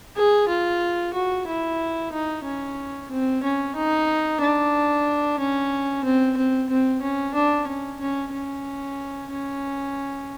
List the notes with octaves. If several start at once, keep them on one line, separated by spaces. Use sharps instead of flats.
G#4
F4
F#4
E4
D#4
C#4
C4
C#4
D#4
D4
C#4
C4
C4
C4
C#4
D4
C#4
C#4
C#4
C#4